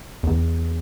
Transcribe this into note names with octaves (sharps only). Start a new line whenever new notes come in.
E2